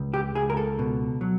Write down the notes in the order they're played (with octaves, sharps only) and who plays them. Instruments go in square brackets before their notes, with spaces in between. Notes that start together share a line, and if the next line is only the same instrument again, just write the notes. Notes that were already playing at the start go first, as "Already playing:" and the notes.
Already playing: [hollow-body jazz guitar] C#2
G4
C#2 G#4
A#4
A4
B2
F#3